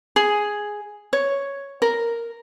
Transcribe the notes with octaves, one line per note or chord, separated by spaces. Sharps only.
G#4
C#5
A#4